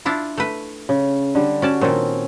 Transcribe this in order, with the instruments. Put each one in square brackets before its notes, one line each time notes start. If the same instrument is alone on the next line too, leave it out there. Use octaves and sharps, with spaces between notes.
[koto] D4 E4 F4
A3 B4
[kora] C#3
D3 G3
[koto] C#4 D5 A5 [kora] F#4
[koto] A#2 D#3 [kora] C4 C#4 A4